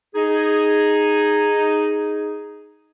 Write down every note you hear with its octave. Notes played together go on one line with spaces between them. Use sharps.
D#4 G#4